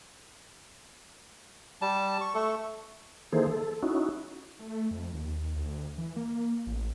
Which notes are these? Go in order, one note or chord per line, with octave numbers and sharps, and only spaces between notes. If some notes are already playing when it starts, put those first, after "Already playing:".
G3 A5
C#6
A3 A4 C#6
D#3 E3 A#3 G#4 A4 C5
A4
C#4 D#4 E4 F#4
A3
F2
D#2
D2
E3
A#3
A1